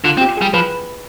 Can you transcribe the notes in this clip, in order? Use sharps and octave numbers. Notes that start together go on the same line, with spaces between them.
D3 F4
C4
G4
G3 G#4
F3 B4